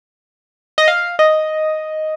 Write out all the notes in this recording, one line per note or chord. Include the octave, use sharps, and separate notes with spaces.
D#5
F5
D#5